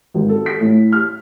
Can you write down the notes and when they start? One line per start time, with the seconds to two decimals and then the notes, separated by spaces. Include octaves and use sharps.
0.14 G#1
0.29 A4
0.46 B6
0.61 A2
0.92 F6